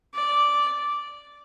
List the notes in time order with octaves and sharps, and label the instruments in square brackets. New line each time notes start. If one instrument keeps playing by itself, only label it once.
[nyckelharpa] D5